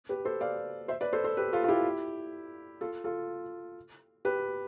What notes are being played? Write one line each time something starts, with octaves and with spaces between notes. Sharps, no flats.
G4 B4
A4 C5
D5 F5
C5 E5
B4 D5
A4 C5
A4 C5
G4 B4
F4 A4
F4
E4 G4
F4 A4
F4 A4
G4 B4